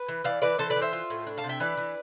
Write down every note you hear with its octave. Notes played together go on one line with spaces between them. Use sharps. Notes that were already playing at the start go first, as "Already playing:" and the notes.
Already playing: B4
E3
E3 D5 F5
E3 B4 D5
E3 A4 C5
B4 D5
E3
C5 E5
F4
A2
D4
F5 A5
C3
E5 G5
E3 B4 D5
E3